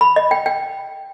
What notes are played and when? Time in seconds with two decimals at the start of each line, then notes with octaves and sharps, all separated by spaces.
0.01 B5
0.16 D#5
0.31 G5
0.46 G5